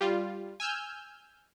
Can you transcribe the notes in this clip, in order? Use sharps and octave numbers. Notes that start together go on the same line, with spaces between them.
G3 F4
G#5 E6 F6 G6